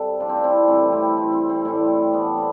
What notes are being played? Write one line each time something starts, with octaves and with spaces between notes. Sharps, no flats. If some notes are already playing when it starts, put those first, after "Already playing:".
Already playing: C3 G3 A4
D4 F4
C4
D4
C4 E4
A2 E3 G3 C4
C4 E4
C4 E4
C4
C4
A2 E3 G3 C4 E4
B3 D4
C4